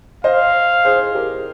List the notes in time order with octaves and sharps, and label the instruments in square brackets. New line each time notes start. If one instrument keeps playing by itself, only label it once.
[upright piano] C5 D#5 [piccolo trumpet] F5
[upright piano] G#4 C5
G4 A#4